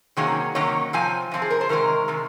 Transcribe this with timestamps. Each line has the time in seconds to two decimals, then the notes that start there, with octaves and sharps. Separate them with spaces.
0.17 C3 D#3 F#3 A#3 C#4 G#4
0.55 C3 D#3 F#3 A#3 C#4 C#5
0.93 C3 F3 C4 G#5
1.31 C3 F3 C4
1.42 G#4
1.50 A#4
1.61 C5
1.69 C3 D#3 G#3 A#4
2.08 C3 D#3 G#3